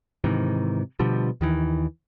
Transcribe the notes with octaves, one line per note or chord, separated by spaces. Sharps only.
G#2 C3 D#3 E3
B2 D3 F3 G3
D#2 D#3 E3